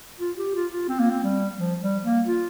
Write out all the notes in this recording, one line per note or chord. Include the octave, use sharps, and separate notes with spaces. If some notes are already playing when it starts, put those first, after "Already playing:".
F4
G4
F4
F4
C4
A#3
C4
G3
F3
G3
A#3
F4